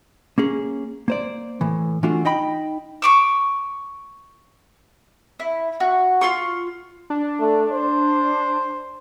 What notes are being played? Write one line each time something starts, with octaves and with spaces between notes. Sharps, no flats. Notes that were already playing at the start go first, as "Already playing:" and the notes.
A#3 C#4 G#4
A#3 C5 D5
A2 E3
E3 A3 D4 F4 F#4
D#4 D#5 G5 B5
C#6 D6 E6
E4
F#4
F4 C6 C#6
D4
A3
C5